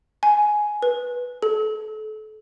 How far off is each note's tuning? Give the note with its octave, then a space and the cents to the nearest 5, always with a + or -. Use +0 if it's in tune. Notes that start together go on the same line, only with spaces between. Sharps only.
G#5 +10
B4 -10
A4 -30